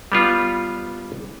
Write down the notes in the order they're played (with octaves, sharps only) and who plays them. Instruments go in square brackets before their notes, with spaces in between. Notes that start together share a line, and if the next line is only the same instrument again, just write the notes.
[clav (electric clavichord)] G3 B3 F4